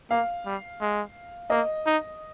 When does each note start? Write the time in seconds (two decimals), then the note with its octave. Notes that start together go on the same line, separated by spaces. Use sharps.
0.10 A#3 F5
0.46 G3
0.81 G#3
1.50 A#3 D#5
1.86 D#4